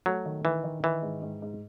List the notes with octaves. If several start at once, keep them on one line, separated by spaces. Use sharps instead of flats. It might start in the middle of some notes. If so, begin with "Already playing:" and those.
F#3 A3
D#3
D#3 E3
D#3
D#3 E3
G#2
G#2
G#2